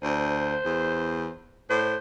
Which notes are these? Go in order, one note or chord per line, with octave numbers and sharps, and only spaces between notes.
D2 C5
E2
A2 C5